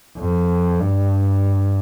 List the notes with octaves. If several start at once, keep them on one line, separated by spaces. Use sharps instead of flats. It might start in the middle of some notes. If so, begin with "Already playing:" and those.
F2
G2